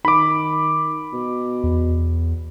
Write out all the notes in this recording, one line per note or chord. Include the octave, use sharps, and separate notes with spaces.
D#3 B5 D6
B2
E2